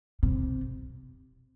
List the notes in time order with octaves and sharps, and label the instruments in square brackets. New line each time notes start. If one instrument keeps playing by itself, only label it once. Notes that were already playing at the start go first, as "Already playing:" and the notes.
[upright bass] C3